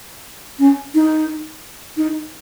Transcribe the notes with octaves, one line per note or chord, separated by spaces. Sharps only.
C#4
D#4
D#4